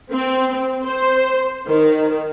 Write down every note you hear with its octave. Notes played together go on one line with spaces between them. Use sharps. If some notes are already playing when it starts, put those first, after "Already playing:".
C4
C5
D#3